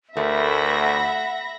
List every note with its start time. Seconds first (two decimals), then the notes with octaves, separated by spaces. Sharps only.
0.17 D2 A3 A#4 E5 B5 A#6
0.80 F#5